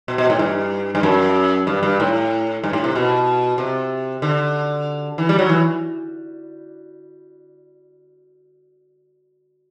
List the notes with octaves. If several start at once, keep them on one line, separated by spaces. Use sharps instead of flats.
B2
B2
A2
G2
G2
F#2
G2
G2
A2
G2
A2
C3
B2
C3
D3
E3
G3
F#3
E3